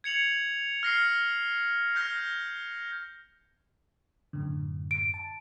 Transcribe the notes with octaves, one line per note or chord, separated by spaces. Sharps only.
G#6 C#7 F7 F#7
F6 A#6 C7
F6 G6 A#6
F#2 A2 D3
D7
A5